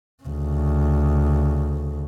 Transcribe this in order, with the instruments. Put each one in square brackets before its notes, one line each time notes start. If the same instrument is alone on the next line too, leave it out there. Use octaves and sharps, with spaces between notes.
[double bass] D2 C#3